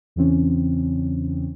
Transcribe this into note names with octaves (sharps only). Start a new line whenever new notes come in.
E2 C#3 E3 C4 C#4